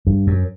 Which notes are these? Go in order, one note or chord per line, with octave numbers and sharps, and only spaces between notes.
G2
F#2